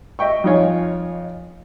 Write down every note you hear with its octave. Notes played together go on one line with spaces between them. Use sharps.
D#5 E5 G5 C#6
F2 D#4 F4 C#5 G#5